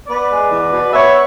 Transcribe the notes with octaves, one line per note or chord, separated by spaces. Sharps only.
B3 B4 D5
G#3
E2
B2
B3 C#5 E5